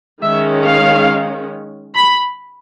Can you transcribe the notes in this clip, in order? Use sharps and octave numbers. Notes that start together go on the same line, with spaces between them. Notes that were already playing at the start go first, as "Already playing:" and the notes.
D#3 G#3 C#4 E5
F5
B5